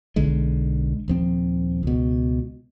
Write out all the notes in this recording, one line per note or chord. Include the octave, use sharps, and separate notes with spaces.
B1 D3 G#3
D#1 F3 C4
C#2 B2